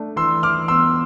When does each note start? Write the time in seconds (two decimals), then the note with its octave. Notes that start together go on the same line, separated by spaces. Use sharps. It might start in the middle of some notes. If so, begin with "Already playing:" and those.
Already playing: A3 D4
0.16 E3 C6 E6
0.43 E3 D6 F6
0.68 B3 C6 E6